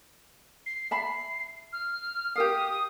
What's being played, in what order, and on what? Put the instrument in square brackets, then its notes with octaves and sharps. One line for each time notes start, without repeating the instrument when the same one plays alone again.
[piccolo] C7
[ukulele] E5 A5 B5 [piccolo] C7
[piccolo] F6
[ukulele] G4 A#4 F5 [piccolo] D#6